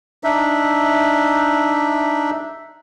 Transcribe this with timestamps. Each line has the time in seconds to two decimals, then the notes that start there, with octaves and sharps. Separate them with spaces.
0.24 D4 D#4 E5